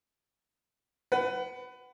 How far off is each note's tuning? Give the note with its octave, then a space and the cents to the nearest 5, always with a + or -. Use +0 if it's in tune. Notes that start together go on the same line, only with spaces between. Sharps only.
B4 +20 F#5 +25